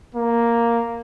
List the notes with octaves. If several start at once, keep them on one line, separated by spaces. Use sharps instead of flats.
A#3